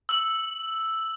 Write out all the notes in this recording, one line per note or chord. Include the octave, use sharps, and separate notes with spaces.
E6 F#7